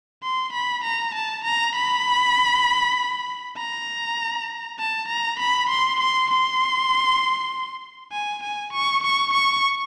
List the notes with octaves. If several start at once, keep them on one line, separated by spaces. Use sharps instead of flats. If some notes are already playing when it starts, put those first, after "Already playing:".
C6
B5
A#5
A5
A#5
B5
A#5
A5
A#5
B5
C6
C6
C6
G#5
G#5
C#6
C#6
C#6